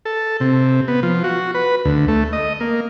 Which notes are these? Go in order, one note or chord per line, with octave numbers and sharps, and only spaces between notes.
A4
C3
B3
F3
F#4
B4
D2
A3
D#5
A#3